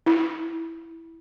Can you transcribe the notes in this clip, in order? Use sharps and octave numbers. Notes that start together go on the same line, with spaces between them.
E4